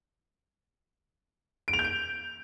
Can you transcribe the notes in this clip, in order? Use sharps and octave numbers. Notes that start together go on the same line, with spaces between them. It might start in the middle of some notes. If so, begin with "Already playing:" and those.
D7
F7
G6
D7